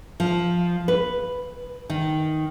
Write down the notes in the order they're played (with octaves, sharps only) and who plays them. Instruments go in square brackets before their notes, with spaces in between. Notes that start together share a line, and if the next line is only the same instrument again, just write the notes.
[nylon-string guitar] F3
B4
D#3